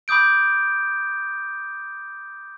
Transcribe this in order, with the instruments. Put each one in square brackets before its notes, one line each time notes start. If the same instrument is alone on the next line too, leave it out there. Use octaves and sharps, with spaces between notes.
[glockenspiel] B5 D6 D#6 G6 D7